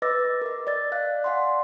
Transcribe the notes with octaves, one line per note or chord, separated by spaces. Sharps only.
B4 D#5 D6 E6 A6 A#6
A#4 D#5
D5 D#5 A6
D5 F5 F#6
D5 F5 F#5 G#5 C6